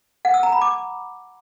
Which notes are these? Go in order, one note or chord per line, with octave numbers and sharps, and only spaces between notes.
F#5
E6
A#5
B5
D6